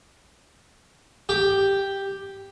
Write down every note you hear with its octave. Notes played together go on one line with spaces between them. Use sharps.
G4